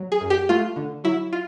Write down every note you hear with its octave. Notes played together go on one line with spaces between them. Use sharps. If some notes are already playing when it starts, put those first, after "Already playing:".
Already playing: F#3
G#4
F#2
G4
A3 F4
D3
F#3 E4
F4